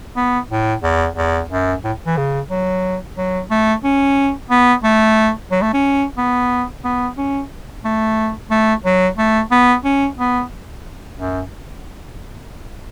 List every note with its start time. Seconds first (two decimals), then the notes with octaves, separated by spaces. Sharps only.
0.16 B3
0.51 A2
0.83 E2
1.17 E2
1.50 F#2
1.84 A2
2.06 E3
2.17 C#3
2.50 F#3
3.18 F#3
3.50 A3
3.84 C#4
4.50 B3
4.84 A3
5.51 F#3
5.62 A3
5.73 C#4
6.17 B3
6.84 B3
7.18 C#4
7.85 A3
8.51 A3
8.85 F#3
9.18 A3
9.51 B3
9.84 C#4
10.18 B3
11.18 F#2